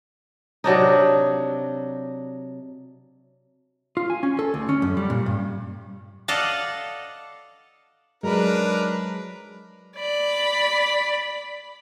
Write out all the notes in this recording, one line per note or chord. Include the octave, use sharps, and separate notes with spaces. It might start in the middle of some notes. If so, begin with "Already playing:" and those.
C3 F#3 D4 D#4
F4
G#5
C#4
A4
D2
C#4
F#2
G3
A#2
G2
A4 D5 D#5 F5 F#5 A5
F#3 G#3 D4 A#4 B4
D5 B5